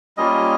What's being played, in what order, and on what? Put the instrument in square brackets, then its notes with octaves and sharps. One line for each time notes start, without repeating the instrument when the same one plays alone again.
[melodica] G3 A#3 C#4 F4 D#5